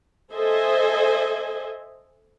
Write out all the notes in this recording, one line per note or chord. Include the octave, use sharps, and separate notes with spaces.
A4 C5 D#5 E5 G#5